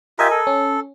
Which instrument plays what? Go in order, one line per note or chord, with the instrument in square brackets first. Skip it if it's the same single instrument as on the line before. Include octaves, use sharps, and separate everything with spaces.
[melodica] F4 G4 E5 [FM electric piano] A#4 D#5 G#5
[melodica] A4
[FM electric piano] C#4